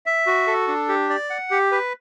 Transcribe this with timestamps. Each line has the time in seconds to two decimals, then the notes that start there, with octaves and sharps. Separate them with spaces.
0.06 E5
0.26 F#4
0.47 A4
0.68 D4
0.89 G4
1.09 D5
1.30 F#5
1.51 G4
1.72 B4